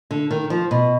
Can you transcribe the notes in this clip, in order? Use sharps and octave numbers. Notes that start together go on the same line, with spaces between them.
D3
D#3
F3
B2